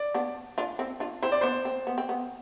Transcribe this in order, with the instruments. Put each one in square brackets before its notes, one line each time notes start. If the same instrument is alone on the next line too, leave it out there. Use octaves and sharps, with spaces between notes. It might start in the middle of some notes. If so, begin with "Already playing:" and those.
Already playing: [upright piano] D5
[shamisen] B3 D4
D4 F4
C4 E4
D4 F4
[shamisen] C4 E4 [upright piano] C5
[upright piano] D5
[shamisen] B3 D4 [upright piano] C5
[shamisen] C4
B3
C4
B3